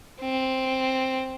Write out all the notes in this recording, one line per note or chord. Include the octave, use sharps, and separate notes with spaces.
C4